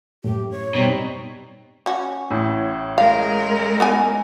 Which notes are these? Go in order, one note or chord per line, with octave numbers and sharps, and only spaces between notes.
F#2 A2 G4
C#5
B2 G3 C4 D#4
C#4 F#4
A1 A2
G#3 A#4 F5
B3 D#4 G#5